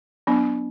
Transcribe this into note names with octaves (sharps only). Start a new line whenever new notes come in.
F#3 B3 D4